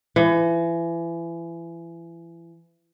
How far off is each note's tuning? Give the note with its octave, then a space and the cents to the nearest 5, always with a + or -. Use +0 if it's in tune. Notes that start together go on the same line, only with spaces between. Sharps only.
E3 +30